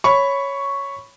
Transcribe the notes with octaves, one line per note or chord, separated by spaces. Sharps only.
C#5 B5 C#6